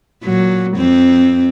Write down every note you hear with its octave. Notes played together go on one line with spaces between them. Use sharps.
A#2 F#3
F2 C4